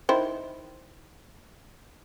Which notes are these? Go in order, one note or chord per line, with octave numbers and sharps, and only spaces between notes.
D#3 E4 C5